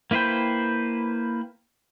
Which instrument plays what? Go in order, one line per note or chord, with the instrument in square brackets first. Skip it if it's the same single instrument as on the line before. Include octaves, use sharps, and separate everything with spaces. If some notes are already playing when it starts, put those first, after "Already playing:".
[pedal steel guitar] A#3 E4 B4 C5 G5